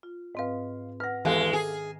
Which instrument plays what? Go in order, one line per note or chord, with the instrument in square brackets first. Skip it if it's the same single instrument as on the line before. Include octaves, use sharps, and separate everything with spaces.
[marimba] F4
[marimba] G#2 C4 B4 [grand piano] D#5 F5
[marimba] B4 F#5 [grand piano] F6 A#6
[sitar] E2 G#3 [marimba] D#3 F#6 [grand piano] G4 A4 F5
[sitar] G#4